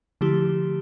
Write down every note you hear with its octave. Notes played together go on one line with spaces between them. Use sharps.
D3 F3 A3 E4 G4